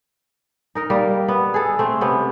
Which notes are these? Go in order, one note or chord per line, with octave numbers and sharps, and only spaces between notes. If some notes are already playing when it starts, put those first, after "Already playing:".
D#4 A#4 D#5
G3 A#3
B3
G#4 A4
A3 C4
C3 B3 C#4